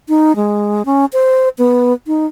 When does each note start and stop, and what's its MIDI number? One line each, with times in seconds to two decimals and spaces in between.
0.09 0.35 63
0.36 0.83 56
0.86 1.06 61
1.13 1.49 72
1.58 1.93 59
2.07 2.26 63